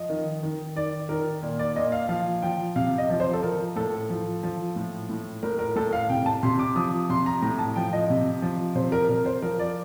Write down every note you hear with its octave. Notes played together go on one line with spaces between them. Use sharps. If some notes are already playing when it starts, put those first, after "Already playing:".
Already playing: F3 D#5
D#3
D#3
D#3 D5
D#3 A#4
A#2
D5
A#2 D#5
F5
F3 F5
F3 G5
C3 F5
D#5
F3
C5
A4
F3 A#4
A2 A4
F3
F3
A2
A2
A2 A#4
A#4
A2 A4
F5
C3 G5
A5
C3 C6
D6
F3 D#6
C3 C6
A#5
A2 A#5
A5
F3 G5
D#5
C3
F3
C3 C5
A#4
C3 A#4
C5
F3 A#4
D5